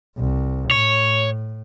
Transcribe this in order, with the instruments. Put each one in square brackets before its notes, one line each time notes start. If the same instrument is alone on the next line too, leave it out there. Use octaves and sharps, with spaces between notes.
[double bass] C2
[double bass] A2 [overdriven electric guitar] C#5